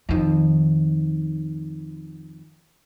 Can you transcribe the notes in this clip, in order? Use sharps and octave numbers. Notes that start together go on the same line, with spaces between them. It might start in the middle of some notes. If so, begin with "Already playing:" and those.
F2 D#3